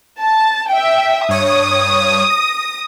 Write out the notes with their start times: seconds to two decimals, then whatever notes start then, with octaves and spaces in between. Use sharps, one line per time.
0.21 A5
0.71 E5 G5
1.29 G2 C#5 D#6
2.30 A#6